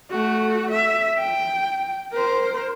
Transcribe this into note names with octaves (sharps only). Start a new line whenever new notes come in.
A3 F#4
E5
G5
A#4 C5